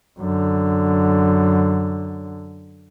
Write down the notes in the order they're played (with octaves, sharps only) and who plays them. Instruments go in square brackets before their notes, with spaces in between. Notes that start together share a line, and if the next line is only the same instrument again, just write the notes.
[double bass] F#2 D3